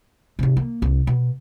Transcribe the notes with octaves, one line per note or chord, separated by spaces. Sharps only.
G#2 C3
A#3
C2
B2